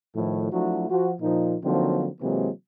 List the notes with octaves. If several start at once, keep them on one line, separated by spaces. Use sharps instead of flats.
A2 D#3 F3
F3 F#3 A3 D4 E4 F#4
F3 F#4
A#2 F3 D#4
D3 F3 F#3 A#3 C4 D#4
C3 E3 F#3 G#3 A#3 C4